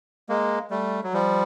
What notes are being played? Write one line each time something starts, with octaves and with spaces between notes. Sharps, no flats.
G#3 A#3
G3 A3
F#3
F3 G3